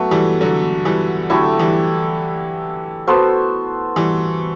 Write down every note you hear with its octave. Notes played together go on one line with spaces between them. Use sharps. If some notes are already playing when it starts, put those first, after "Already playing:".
Already playing: F#3 A3 B3 F#4 A4
E3 G3
D3 F#3
E3 G3
D3 F#3 A3 E4 G4
E3 G3
B3 F#4 A4 C5
E3 G3